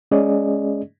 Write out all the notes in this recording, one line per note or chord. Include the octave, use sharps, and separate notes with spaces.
G#3 C#4 G#4 D5 D#5